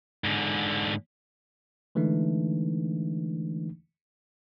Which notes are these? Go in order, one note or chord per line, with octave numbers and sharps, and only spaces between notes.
G#2 D3
D3 E3 G#3 A3 D4 D#4